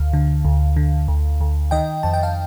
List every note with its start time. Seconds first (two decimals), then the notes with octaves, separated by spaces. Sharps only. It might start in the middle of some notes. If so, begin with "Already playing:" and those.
Already playing: D2 F5
0.13 D3
0.45 D2
0.76 D3
1.08 D2
1.41 D2
1.71 D#3 D#5 G5
2.03 F2 A5
2.13 G5
2.23 F5 A5